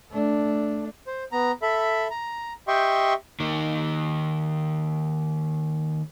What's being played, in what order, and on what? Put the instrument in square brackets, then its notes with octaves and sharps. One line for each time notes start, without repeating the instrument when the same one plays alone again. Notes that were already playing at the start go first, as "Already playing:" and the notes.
[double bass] A3 D4
[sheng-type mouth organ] C5
B3 A#5
A4 E5 B5
A#5
G4 D#5 E5 G5 C6 C#6
[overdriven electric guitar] D#3 A#3